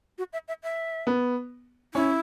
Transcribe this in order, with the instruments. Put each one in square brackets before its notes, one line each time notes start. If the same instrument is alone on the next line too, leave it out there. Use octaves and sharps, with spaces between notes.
[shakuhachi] F#4
E5
E5
E5
[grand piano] B3
[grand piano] C#4 [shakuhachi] E4